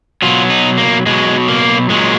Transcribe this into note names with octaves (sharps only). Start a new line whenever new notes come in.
B2 F#3 F4
D#4
A#3
B2 F#3 G#3
A#3
A#2 F#3 G#3